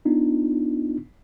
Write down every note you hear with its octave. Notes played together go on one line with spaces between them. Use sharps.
B3 D4 D#4 F4